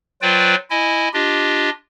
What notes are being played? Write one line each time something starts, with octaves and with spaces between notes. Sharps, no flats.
F#3 F4 B4 C5 D5 G5
E4 D#5 G#5
D4 F4 G4 D#5